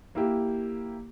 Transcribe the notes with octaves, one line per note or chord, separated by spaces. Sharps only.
A#3 E4 G4